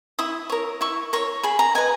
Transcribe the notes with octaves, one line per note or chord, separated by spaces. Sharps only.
E4 D#6
A#4 C#5
E4 C#6
A#4 C#5 C#6
G#4 B5
A#5
B4 D#5 G#5